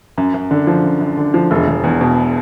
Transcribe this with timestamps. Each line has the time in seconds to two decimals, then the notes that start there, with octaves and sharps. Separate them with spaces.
0.18 F#2
0.34 F#2
0.51 D3
0.67 F3
0.84 F#2
1.01 F#2
1.17 D3
1.34 F3
1.51 E1
1.68 E1
1.84 E2
2.01 B2